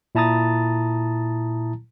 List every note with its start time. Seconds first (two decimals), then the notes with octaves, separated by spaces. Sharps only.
0.15 A#2 E4 A5 A#5 D#6 A6